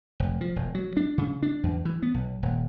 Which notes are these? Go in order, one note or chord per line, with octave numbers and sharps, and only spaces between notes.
F1
F3
E1
F#3
D4
C#3
D4
E2
E3
B3
B1
D#1